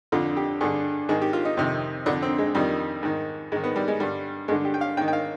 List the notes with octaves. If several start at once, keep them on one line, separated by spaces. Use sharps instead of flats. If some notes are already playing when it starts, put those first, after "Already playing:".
F2 D3 F4
G4
G2 D3 G#4
G#2 D#3 G#4
G4
F4
D#4
F2 C3 D#3
F2 D3 D4
C4
G#3
F2 D#3 G3
G#2 D#3
G#2 D#3 G#3
B3
G3
G#3
G2 D3 G3
G2 D3 G#3
G4
G5
F5
G#2 D#3 G5
G5
F5